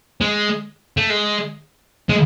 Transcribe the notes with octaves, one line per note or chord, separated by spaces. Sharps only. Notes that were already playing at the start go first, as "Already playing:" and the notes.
G#3
A3
G#3
G#3